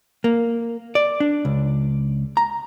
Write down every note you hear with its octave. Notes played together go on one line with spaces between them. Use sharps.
A#3
D5
D4
C#2
A#5